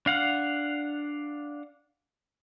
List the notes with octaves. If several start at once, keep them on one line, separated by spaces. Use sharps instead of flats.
D4 F5 F#5